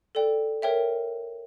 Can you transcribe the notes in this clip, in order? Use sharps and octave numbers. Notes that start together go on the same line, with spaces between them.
A4 D5 G5
A#4 C#5 E5 G5